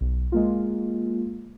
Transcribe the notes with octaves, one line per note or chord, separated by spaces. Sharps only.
B1
G#3 A#3 F4